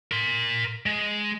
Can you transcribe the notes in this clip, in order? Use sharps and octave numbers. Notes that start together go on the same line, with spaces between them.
A#4 C6
G#3